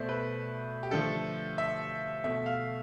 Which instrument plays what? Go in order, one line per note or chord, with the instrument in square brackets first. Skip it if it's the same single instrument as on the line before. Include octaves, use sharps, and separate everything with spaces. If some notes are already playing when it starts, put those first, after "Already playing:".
Already playing: [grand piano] B2 A3 C5 D5 E5
B4
G4
D3 F3 A3 A4
E5
B2 A3 E5
F5